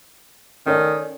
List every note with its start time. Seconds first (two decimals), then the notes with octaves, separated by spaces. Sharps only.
0.66 D#3 C#4 A4 D5